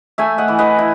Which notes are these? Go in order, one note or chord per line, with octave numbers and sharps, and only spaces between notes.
A3 E5 G#5
D#5 F#5
E3
B4 D#5
E4